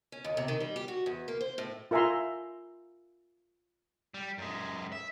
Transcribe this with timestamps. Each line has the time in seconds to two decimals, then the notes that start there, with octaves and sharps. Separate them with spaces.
0.12 C#4
0.24 D#2
0.37 C3
0.48 D#3
0.60 G3
0.76 G4
0.88 F#4
1.06 E2
1.28 A#3
1.41 C5
1.58 A2
1.91 F4 A#4 E5 G#5 A#5 C6
4.14 G3
4.38 F#2 G#3
4.92 E5